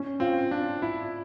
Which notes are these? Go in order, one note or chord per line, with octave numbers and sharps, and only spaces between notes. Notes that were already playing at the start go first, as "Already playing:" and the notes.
Already playing: C#4
C4 F4
D4 F4
E4 F4